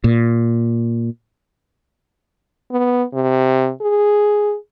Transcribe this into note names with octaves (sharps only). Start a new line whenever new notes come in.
A#2
B3
C3
G#4